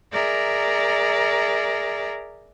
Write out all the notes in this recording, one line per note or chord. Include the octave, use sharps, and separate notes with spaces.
G#4 A#4 D5 E5 A#5